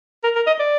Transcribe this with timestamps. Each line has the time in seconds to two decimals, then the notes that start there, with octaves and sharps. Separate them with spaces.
0.24 A#4
0.36 A#4
0.47 D#5
0.60 D5